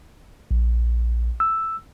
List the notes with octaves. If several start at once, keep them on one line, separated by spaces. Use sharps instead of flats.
A#1
E6